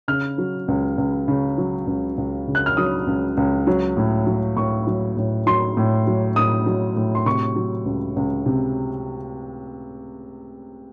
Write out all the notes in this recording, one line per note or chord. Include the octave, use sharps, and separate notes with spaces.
C#3 F6
F#3
C#2
C#2
C#3
F#3
C#2
C#2
C#3
F#6
F6
F#3 D#6
C#2
C#2
F#3
A2
F#3
A2 C#6
F#3
A2
F#3 C6
A2
F#3
A2 D#6
F#3
A2
C6
C3 C#6
F#3
C#2
C#2
C3